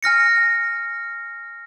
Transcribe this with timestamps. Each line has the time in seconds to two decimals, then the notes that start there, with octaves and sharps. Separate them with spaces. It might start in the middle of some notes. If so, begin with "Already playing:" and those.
0.03 G#5 F6 A#6 C#7